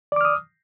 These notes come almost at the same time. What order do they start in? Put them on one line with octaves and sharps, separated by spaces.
D5 D6 F6 D#6